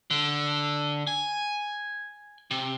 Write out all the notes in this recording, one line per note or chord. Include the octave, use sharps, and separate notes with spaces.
D3
G#5
C3